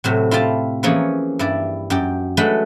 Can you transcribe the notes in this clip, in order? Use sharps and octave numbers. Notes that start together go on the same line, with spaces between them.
A2 C3 F#3
E4 F4 G4 F5 A5
E3 F3 A#3 C#4 G#4 C#5
G2 E4 D5
F#2 G4 G5
F#3 G#3 A3 D4 B4 F#5